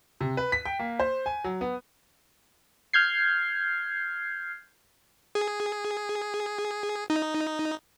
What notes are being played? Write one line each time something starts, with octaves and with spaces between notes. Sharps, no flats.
C3
B4
B6
G5
A#3
C5
G#5
F#3
B3
F6 G6 G#6 C7
G#4
D#4